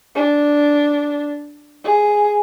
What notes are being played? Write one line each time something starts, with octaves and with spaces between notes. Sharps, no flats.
D4
G#4